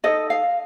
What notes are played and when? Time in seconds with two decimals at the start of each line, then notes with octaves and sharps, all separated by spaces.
0.04 D#4 A4 D#5
0.30 F5